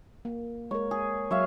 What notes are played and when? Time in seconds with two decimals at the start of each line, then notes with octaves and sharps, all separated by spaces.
0.25 A#3
0.71 G#3 A#4 C#5
0.91 G#4
1.31 F#3 C#5 E5 F5